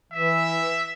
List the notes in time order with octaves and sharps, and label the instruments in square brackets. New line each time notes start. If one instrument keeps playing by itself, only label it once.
[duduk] E3 [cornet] E5